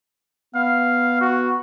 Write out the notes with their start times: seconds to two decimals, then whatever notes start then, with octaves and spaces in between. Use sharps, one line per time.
0.55 B3 F5
1.21 F#4